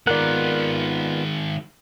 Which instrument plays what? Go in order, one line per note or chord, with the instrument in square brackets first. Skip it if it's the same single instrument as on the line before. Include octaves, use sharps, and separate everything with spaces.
[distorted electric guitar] D#3 G#3 [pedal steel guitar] B3 F4 F#5 [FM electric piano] A#4 D5